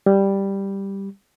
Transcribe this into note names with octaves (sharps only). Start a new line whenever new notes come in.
G3